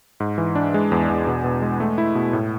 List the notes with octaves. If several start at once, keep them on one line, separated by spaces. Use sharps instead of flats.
G#2
E3
D4
G#3
E2
E2
B2
B2
G#3
A3
E4
B2
A2